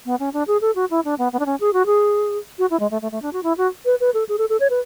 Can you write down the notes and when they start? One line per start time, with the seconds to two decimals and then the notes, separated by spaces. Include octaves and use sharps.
0.06 B3
0.20 C#4
0.33 D4
0.47 G#4
0.61 A4
0.75 F#4
0.90 E4
1.05 D4
1.18 B3
1.33 B3
1.39 D4
1.46 C#4
1.60 G#4
1.73 F#4
1.86 G#4
2.59 F#4
2.70 E4
2.80 G#3
2.91 A3
3.02 A3
3.12 A3
3.22 D4
3.33 F#4
3.43 E4
3.58 F#4
3.86 B4
4.00 B4
4.14 A4
4.29 G#4
4.38 A4
4.49 A4
4.60 C#5
4.70 B4